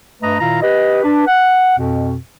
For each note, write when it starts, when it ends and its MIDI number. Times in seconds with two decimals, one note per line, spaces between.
0.22 0.36 43
0.22 0.36 57
0.22 0.36 71
0.22 0.36 75
0.22 0.36 82
0.40 0.61 46
0.40 0.61 51
0.40 0.61 64
0.40 0.61 65
0.40 0.61 77
0.40 0.61 82
0.62 0.99 67
0.62 0.99 71
0.62 0.99 75
1.03 1.23 62
1.03 1.23 71
1.26 1.77 78
1.77 2.15 41
1.77 2.15 47